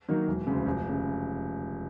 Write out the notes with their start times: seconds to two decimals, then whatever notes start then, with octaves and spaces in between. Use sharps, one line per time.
0.08 D#3 F#3 A#3 D#4
0.28 E1
0.47 D2 C#3
0.66 F1
0.89 C#3